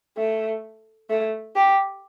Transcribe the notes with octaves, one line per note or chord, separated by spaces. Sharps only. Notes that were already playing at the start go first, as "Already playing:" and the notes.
A3
A3
G4